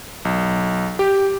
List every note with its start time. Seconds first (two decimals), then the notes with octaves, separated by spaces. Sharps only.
0.25 B1
0.99 G4